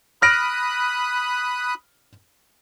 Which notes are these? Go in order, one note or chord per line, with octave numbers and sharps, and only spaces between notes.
B5 D#6 F6 F#6 A#6 D7